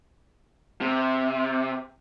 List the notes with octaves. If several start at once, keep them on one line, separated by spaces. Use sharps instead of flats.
C3